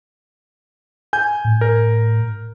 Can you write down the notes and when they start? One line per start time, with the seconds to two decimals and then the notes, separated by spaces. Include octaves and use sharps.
1.13 G#5 G6
1.45 A2
1.61 A#4